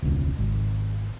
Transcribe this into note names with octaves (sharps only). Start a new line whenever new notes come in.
E1 C#2
G#1